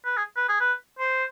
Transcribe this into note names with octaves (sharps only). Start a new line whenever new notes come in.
B4
G#4
B4
G#4
B4
C5